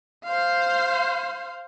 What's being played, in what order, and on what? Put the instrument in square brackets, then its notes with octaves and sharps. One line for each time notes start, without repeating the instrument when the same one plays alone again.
[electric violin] C5 F5